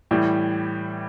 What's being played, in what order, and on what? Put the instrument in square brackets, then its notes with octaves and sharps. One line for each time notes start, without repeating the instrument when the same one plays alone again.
[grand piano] A2 E3 G3